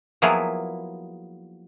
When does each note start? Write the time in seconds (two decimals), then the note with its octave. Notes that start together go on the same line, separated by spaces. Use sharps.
0.22 F3 F#3 A#3 B3 E4 G#4